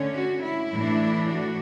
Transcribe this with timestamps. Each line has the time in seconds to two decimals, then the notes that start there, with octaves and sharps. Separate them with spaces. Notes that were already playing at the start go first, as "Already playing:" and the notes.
Already playing: D3 A3 C#4
0.16 F#4
0.44 E4
0.73 A2 E3 A3 D4
1.32 F#4